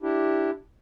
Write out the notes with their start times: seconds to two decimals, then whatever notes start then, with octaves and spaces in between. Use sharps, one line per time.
0.03 D4 E4 G4